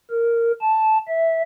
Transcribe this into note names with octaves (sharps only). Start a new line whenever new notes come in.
A#4
A5
E5